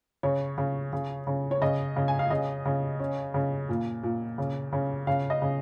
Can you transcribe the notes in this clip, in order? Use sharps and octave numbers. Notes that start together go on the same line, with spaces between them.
C#3 C#5
C#3
C#3
C#3
C#5
C#3 D#5
C#3
G#5
F5
C#3 D#5
C#3
C#4
C#3
A#2
A#2
C#3
C#3
C#3 F5
D#5
C#3